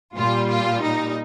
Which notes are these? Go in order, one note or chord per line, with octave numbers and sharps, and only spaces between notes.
A#2 G3 F4
F4
D#4